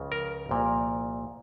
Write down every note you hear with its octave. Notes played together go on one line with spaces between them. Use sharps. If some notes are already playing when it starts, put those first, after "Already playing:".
Already playing: C#2 C#3 F3
A#4
C2 A#2 F3